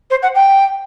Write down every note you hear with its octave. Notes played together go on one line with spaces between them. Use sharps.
C5
F#5
G5